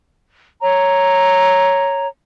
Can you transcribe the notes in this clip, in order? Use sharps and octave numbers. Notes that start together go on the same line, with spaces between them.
C#5 A#5